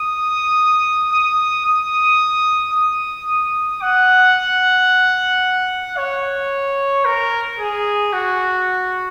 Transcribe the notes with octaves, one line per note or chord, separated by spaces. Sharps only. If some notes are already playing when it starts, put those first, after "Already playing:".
Already playing: D#6
D#6
D#6
D#6
F#5
C#5
A#4
G#4
F#4